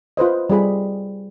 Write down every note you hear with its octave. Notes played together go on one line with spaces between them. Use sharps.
F4 B4 C5 D#5
G3 F4 G#4 B5